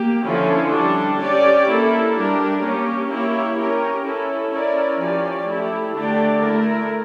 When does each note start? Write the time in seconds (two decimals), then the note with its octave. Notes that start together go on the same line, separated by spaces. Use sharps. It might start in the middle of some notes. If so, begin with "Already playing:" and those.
Already playing: A#3 G4
0.25 D3 F3 C#4 E4
0.73 G3 D4 A4
1.21 C#4 G4 D5
1.68 A#3 E4 A4
2.16 G3 D4 G4 A#4
2.63 A#3 C#4 G4
3.10 A#3 E4 G4 C#5
3.58 C#4 G4 A#4
4.05 C#4 E4 A4
4.52 C#4 E4 A#4 D5
5.01 F3 C#4 G4 D5
5.47 A3 E4 G4
5.95 D3 A3 D4 G4 D5
6.43 A3 E4 A#4